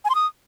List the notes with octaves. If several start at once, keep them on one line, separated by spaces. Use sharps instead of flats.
G#5
C6
D#6